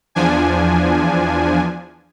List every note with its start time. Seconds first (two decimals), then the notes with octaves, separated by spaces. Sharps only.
0.15 E2 F3 D4 G#5